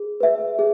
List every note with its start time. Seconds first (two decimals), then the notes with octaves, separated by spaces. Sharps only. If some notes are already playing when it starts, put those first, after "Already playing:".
Already playing: G#4
0.20 B4 E5
0.59 G#4